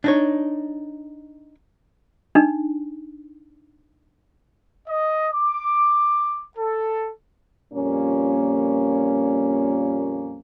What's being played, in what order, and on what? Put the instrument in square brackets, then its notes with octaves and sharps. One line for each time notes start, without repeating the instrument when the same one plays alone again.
[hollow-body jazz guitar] D4 D#4 C#5
[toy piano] D4 D#4
[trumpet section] D#5
D6
A4
[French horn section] F2 A#2 G3 A#3 C#4